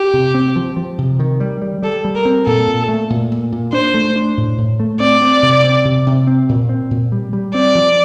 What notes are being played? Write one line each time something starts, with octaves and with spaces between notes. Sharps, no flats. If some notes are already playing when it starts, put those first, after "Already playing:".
Already playing: G4
C3
C4
F3
F3
C3
D#3
G3
G3
G3 A4
G3
A#4
C4
A#2 A4
A#2
A3
A#2
A#2
A#2
D4 C5
A3
D4
A2
A2
A3
C4 D5
C4
C3
C4
C3
C3
C4
A#2
C4
A#2
G3
G3
C4 D5
F3